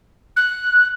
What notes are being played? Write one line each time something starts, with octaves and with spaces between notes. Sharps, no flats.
F#6